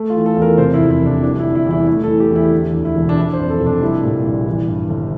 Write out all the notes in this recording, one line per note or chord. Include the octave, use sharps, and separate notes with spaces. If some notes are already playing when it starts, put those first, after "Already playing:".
Already playing: A3
F4
E3
A4
E2
A#4
C3 C5
E4
F2
E4
F1 D4
G3 D4
E4
D3
E4
E2 E4
A3 E4
A4
E3
G4
E2
E4
D3
D2
E4
E1
D4
E3 E4
C5
F2
A4
F1
D4
G3 E4
A#2
A#1
E3
G2
G1